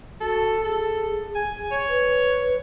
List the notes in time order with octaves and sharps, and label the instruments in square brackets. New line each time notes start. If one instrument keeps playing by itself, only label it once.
[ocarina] F#4 [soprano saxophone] A4
[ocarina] G#4 [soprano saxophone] A4
[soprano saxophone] G#5
C#5
[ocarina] B4